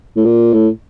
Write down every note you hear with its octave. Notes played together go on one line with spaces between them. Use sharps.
A2
A#2
A2